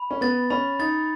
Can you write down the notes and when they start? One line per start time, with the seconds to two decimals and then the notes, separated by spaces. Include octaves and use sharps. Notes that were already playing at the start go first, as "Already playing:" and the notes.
Already playing: B5
0.11 C#4
0.21 B3 A6
0.50 C#4 B5
0.79 D#4 A6